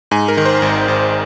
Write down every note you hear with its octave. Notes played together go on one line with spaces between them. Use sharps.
G#2 G#5
A#4
D#3
C5
G#1
G#1